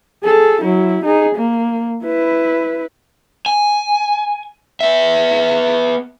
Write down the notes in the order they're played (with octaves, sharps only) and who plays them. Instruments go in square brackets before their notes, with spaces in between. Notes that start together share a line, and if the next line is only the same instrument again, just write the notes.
[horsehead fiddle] G#4 A4
F#3 E4
D#4 G#4
A#3
E4 B4
[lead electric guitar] G#5
B3 E5